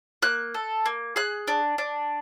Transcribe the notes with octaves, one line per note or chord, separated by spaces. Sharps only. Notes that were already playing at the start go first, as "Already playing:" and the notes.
A#3 F#6
A4
A#3
G#4 F#6
D4
D4